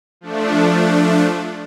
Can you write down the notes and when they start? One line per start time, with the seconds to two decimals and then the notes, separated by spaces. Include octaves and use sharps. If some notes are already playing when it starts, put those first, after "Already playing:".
0.21 F3 A3 D4